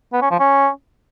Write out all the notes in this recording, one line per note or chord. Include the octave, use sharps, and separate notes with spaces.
B3
C#4
F3
C#4